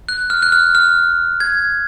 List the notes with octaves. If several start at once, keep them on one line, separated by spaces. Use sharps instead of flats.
F#6
F6
F#6
F6
F6
G#6